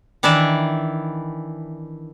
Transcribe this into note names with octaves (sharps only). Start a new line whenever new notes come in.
D#3 E3 D4 E4 D5 E5